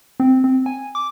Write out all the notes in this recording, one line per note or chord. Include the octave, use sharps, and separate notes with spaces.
C4
C4
G#5
D6